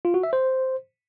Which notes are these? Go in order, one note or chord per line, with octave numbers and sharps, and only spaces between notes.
F4
F#4
E5
C5